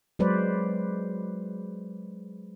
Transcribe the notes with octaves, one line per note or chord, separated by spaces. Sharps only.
F#3 G#3 B4 C5 D5